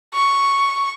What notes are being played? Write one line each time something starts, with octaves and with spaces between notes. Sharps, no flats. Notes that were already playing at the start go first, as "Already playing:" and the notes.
C#6